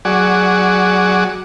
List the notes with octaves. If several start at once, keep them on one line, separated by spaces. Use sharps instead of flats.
F#3 F#4 G#4 D5